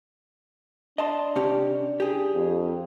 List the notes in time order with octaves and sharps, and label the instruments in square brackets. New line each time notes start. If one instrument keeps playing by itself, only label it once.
[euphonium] D4 [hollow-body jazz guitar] D#5 A5 C6
[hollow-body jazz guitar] C3 C#4 G4
G4 G#4
[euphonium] F2